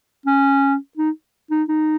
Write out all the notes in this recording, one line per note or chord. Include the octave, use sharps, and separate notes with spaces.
C#4
D#4
D#4
D#4